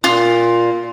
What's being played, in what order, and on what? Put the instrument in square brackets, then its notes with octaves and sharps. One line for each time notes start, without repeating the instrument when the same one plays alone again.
[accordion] A#2 [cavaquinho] F4